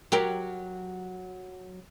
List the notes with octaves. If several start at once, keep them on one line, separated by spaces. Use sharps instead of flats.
F#3 G4 A#4